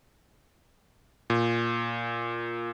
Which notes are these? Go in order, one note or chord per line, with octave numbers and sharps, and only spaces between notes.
A#2